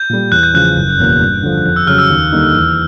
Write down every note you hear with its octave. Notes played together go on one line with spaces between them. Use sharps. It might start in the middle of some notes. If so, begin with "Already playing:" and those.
Already playing: G6
A#2 G3
E2 F#6
G6
C#3 F3 G#3 C#4 F#6
F#1
E2 B2 F#3 A#3
G2
D3 F3
F2
E6
C#3 F#3 F6
E6
D#2
D3 G3 A#3 D#4
E2